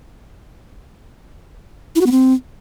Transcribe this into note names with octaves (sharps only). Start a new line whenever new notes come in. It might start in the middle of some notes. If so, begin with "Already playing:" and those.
E4
F#4
B3
C4